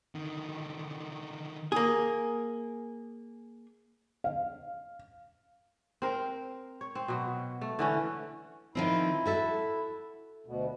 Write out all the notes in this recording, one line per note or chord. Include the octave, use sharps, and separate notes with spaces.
D3 D#3
A#3 G#4
F5
C4 A#4
C#5
C4
B2 F#3
A3
D3 E3 C#4
D#3 F3 C4 E4
F#4 A4 E5
D2 B2